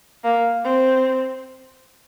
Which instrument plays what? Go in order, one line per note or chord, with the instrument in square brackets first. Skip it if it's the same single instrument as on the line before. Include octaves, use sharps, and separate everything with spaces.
[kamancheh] A#3
C4